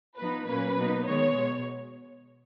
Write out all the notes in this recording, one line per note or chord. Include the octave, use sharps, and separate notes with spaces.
F3 B3 D#4 B4
A#2 F#3 A#3 C#4 B4
B2 A#3 D#4
D#3 G#3 B3 C#5
B2